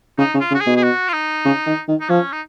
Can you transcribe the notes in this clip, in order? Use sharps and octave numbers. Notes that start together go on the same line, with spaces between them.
C#3 D#4
C#3
F4
C#3
F#4
G#4
B2
G#4
F#4
F4
D#4
C#3
D#3
D#3
D#4
F3 C#4
D#4